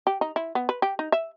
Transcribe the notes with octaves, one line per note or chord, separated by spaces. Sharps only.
G4
D#4
E4
B3
B4
G4
D#4
E5